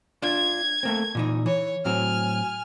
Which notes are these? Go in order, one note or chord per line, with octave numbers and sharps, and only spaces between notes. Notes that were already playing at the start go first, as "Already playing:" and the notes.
D4 F4 G#6
A3 A#3 C4
A#2 E3 D#4
E3 C#5
A2 F#3 C4 G#5 F6